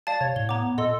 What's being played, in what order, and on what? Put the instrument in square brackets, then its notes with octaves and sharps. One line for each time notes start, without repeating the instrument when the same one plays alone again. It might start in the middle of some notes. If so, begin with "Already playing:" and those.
[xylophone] D5 F5 A5 [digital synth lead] A6
[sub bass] C3 [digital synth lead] C#5
[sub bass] A2 [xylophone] G7
[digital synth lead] B3 [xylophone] A#5 D6
[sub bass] A#2 [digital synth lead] A4 [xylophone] D#5 C6